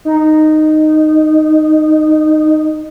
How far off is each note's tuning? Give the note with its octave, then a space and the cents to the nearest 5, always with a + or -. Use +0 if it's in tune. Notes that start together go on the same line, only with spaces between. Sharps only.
D#4 -10